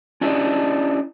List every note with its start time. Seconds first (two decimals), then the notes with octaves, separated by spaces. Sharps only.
0.21 C#4 D4 E4 G4 D5 D#5